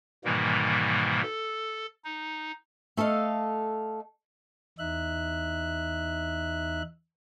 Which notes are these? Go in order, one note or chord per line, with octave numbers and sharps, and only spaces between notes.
G#2 B2 D#3 E3 G3 A#3
A4
D#4
A3 A4 D#5 F5
E2 D#4 E5 F#6